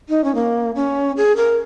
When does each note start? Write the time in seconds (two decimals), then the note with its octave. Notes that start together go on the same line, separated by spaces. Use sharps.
0.09 D#4
0.24 C#4
0.35 A#3
0.76 C#4
1.17 G#4
1.36 A#4